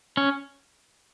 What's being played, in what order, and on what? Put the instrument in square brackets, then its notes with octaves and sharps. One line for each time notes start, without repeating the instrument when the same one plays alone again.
[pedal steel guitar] C#4